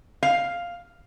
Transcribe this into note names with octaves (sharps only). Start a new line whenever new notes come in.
F5